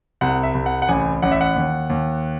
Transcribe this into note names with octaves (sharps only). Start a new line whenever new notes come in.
C2 F#5
E5
C2
F#5
F#5
A1 G#5
A1 F#5
E5
F#5
D#2
D#2